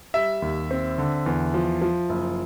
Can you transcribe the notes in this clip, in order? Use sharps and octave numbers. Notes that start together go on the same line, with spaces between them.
G3 E5
D#2
C4
D3
E2
F3
F3
F#1